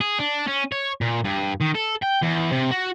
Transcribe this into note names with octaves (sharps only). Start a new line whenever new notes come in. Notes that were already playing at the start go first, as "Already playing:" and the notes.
G#4
D4
C#4
C#5
A#2
G2
D#3
A4
G5
E2
C3
F#4